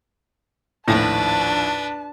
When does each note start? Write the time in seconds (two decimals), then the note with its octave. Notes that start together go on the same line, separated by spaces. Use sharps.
0.88 A#1 D#2 A2 F3 D4 B4 A5